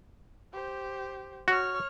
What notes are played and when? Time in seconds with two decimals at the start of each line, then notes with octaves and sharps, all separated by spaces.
0.53 G4 C5
1.48 F#4 C#5 F6